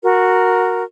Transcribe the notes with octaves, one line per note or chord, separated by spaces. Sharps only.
F#4 A#4